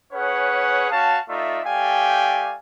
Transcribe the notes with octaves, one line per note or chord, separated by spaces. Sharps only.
C#4 G#4 B4 C#5 F#5
C#4 F#4 F5 A5
A3 D#4 F4 D5 E5
A3 G4 D5 F5 G5 G#5